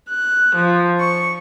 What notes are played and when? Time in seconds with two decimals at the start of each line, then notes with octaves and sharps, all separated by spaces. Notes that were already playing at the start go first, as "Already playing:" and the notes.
0.10 F#6
0.57 F3
1.00 C#6